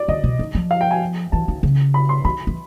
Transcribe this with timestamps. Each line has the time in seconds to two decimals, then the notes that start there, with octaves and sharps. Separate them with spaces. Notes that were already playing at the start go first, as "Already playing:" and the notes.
Already playing: D5
0.08 D3 D#5
0.24 B2
0.39 D#3
0.55 F3
0.71 F5
0.81 G5
0.91 G#5
1.32 E3 A5
1.48 D#3
1.63 C#3
1.94 B5
2.09 C6
2.25 D#3 B5
2.47 E3